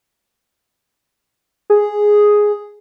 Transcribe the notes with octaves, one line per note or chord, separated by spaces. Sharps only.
G#4